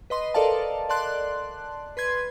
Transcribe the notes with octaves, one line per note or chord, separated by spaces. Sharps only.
B4 D#5 C6
A4 A#4 D5 D#5 F5 A5
D5 A5 C6 F#6
B4 C6 G#6